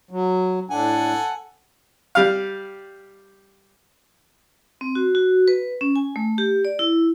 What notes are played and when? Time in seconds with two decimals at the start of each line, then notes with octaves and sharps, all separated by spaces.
0.11 F#3
0.70 A2 D4 A4 F#5 G#5
2.15 G3 F5
4.81 C4
4.95 F#4
5.15 F#4
5.48 B4
5.81 C#4
5.96 G#5
6.16 A3
6.38 G4
6.65 D5
6.79 E4